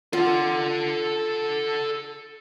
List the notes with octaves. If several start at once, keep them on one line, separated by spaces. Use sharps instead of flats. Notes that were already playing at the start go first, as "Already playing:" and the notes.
F4 A4 F#5